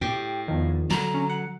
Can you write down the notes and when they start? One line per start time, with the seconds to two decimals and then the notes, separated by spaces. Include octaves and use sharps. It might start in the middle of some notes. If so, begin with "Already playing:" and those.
0.01 A2 G4 G5
0.48 E2 D#3 F3
0.90 D3 F#3 A#5
1.14 C#4
1.29 F#5